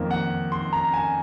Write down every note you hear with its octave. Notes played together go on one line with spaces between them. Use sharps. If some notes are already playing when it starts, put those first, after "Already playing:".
Already playing: F2 D#3 A#3
F#5
C6
A#5
G#5